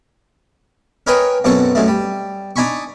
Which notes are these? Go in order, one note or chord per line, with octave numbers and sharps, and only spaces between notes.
A#4 B4 C#5 D#5 G5 G#5
F#2 B2 C4 A4 C#6
F#2 G#3 A3
G3
D4 D#4 G#5 B5 C#6